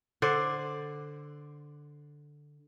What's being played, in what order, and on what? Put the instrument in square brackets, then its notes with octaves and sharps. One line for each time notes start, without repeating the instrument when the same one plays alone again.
[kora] D3 C5 D5